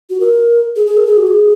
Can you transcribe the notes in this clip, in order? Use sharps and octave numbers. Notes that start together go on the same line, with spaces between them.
F#4
A#4
G#4
G#4
A#4
G#4
F#4
G#4